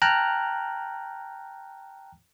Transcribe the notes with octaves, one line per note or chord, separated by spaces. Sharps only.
G5 A5 A#5 F6 F#6